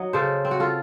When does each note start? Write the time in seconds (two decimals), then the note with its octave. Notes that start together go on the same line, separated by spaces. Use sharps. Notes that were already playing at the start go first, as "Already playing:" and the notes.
Already playing: F#3 D#4 D#5
0.13 C#3 A4 C5
0.45 C4
0.51 F#4
0.60 F4 A4